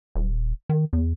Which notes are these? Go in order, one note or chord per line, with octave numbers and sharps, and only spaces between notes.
D#1
D#3
E2